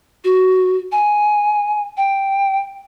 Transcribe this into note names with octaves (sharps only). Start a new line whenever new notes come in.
F#4
G#5
G5